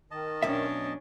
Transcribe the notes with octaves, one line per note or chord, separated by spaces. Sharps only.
D#3 D#5 A5
B1 C#4 D4 E5